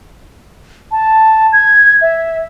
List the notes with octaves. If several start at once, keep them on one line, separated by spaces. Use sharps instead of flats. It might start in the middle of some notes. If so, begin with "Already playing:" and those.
A5
G#6
E5